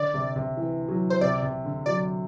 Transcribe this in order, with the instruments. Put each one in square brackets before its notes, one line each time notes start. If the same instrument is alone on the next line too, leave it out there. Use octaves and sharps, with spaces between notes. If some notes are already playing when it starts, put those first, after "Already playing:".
Already playing: [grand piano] D3 [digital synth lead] D5
[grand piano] C3
C3
E3
F#3
[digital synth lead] C5
[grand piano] C3 [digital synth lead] D5
[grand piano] C3
D3
[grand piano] F#3 [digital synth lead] D5